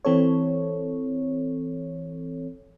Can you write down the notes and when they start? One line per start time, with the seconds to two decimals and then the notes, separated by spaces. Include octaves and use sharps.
0.05 E3 C4 A4 C#5